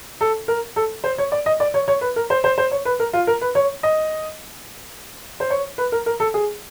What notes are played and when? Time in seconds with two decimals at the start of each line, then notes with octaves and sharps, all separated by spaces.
0.21 A4
0.48 A#4
0.76 A4
1.04 C5
1.18 C#5
1.32 D5
1.46 D#5
1.60 D5
1.74 C#5
1.88 C#5
2.01 B4
2.16 A#4
2.30 C5
2.44 C5
2.58 C5
2.71 C#5
2.85 B4
3.00 A#4
3.13 F4
3.27 A#4
3.41 B4
3.55 C#5
3.83 D#5
5.40 C5
5.50 C#5
5.78 B4
5.92 A#4
6.06 A#4
6.20 A4
6.34 G#4